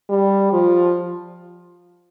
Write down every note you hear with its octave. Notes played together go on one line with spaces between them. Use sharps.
G3
F3